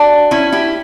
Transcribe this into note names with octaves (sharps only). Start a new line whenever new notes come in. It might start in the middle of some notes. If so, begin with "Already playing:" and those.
Already playing: D4 F#4
C#4 E4
E4 G4